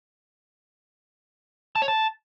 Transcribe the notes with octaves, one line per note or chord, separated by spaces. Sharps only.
A5
C#5
A5